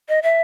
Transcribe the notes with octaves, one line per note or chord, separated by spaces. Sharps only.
D#5
E5